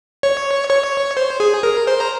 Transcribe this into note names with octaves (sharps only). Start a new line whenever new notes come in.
C#5
C#5
C5
G#4
A#4
C5
A#5